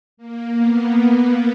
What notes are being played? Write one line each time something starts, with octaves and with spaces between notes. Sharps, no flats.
A#3
B3